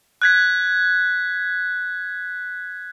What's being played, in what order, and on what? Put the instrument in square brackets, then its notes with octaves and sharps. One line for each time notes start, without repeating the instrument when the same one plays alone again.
[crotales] F#6 G#6 B6